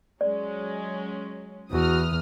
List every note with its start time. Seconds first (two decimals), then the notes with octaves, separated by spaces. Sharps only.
0.21 F#3 G#3 C#4 D5
1.72 E2 E3 F#4 D#6 F6